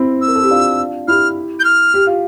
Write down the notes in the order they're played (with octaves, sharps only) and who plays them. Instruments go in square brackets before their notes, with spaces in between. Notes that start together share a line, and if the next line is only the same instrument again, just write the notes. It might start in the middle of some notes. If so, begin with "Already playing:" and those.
Already playing: [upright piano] C4 E4
[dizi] E6
[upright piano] A#4
A4
G4
D4 F4
[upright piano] E4 G4 [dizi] F6
[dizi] G6
F6
[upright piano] G4
F4